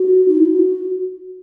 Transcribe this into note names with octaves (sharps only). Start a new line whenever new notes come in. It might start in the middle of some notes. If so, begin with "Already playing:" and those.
Already playing: F#4
D#4
E4
F#4